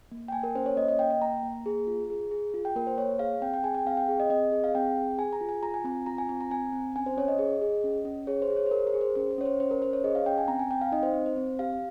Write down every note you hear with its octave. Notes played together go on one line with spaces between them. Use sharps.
A#3
G5
A#3 G#5
A#4
C#4 C5
C#5
A#3 D#5
D#5
A#3 G5
G5
A#3 A#5
A#3
G#4
F4
G#4
G#4
F4
G5
A#3 A#4
C5
A#3 C#5
G#4 F5
C4 G5
G5
G#4 G#5
G5
C4 F5
G5
G#4
D#5
C4 D#5
G#4
F5
C4 G5
G#4
G#4 G#5
A#5
F4
G#5
F4 A#5
G#5
C4 A#5
F4 A#5
G#5
C4 A#5
A#5
C4 G#5
C4
C#4 G#5
C5
C#4 C#5
D#5
G#4
G#4
C#4
C#4
G#4 C#5
C5
G#4
C#5
C5
G#4 A#4
A#4
G#4
C5
C#4 C5
C5
C#4 C#5
C5
C#4 C5
A#4
C#4 C5
C#5
G#4 D#5
F5
C#4 G5
G#5
C4 A#5
G#5
C4 G5
F5
D#4 D#5
C5
C4
C5
C4
G4 F5